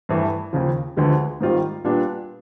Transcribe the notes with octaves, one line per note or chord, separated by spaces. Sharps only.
G2 E3 A3
D#2 C#3 F3
D2 D3 F3 G#3 B3
G#2 D#3 G3 C4 F4
A#2 G3 B3 D4